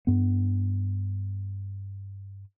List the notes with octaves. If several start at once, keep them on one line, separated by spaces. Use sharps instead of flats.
G2 B3